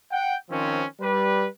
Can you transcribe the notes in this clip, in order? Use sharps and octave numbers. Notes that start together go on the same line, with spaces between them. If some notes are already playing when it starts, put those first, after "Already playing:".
F#5 G5
D#3 F3 C4 C#4
G3 B4